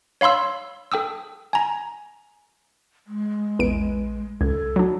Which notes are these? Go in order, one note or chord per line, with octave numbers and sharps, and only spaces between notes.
C#5 F5 B5 C6 E6
A4 G5 D#6 E6
G#5 A#5
G#3
A#1 E2 B4 D7
C#2 A4 G#6
F#3 D4 F#4